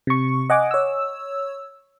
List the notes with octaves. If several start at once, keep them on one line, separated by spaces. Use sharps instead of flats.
C3 C#6
D#5 F#5 G#5 D6
C#5 E6